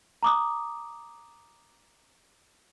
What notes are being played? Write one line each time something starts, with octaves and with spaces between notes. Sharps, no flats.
A#5 D6 D#6